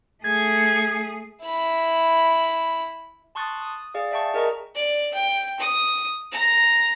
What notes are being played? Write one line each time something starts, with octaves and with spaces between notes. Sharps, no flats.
A3 G#4 G#6
E4 B5
A5 C6 C#6 D#6 F#6 A6
D#6
G#4 D5 F5
D5 E5 G5 A5 C#6
G#4 A#4 D#5 A#5 C#6
D5
G5
D#6
A#5